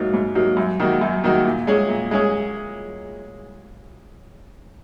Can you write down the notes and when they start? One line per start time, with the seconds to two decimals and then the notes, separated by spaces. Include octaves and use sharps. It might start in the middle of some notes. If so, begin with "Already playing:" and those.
Already playing: G#2 F#3 A#3 D#4
0.14 G#2
0.35 F#3 A#3 D#4
0.57 F#2
0.80 D#3 A#3 D#4 F#4
1.01 F#2
1.24 D#3 A#3 D#4 F#4
1.45 A#2
1.67 G#3 C#4 G#4
1.89 A#2
2.11 G#3 C#4 G#4